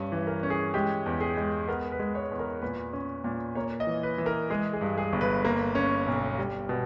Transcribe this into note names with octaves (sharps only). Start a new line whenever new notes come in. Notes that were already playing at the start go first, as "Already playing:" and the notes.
Already playing: G2 C#4
E3
A#4
C#4
G#4
G#3 G4
E2
G#4
G#3
B3 A#4
B4
G#3
C#5
E2
A#4
A#2 B4
C#4
A#2
A#3 C#5
D#5
E3
B4
E3
A#4
G#3 G#4
G#4
G2
G#4
G1
B4
A#3
C#4
B1
G3
B2